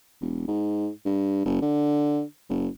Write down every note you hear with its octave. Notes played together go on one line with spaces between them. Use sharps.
E1
G#2
G2
F#1
D3
F#1